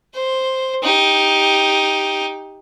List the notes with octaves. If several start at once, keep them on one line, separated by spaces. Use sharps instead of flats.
C5
D#4 G4